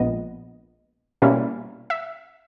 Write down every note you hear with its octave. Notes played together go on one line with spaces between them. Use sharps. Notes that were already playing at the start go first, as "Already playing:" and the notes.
Already playing: A#1 A#2 G#3 B3 D#5
B2 G3 A#3 C#4 E4
E5